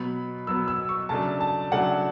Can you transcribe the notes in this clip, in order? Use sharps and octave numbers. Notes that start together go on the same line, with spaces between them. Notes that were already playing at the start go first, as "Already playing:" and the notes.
Already playing: B2 F#3 B3 B5
B2 F#3 B3 E6
E6
C#6
C#3 F#3 A3 D4 A5
A5
C#3 F#3 A3 D4 F#5